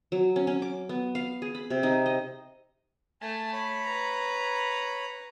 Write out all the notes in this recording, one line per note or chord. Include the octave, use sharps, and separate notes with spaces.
F#3
C#4
C#4
D6
B3
F5
G#4
B5
C3
D#4
D#5
A3 G#5 A5
C#5 B5
B4 A#5